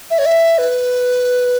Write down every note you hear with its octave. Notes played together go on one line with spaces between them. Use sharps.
E5
C#5
E5
B4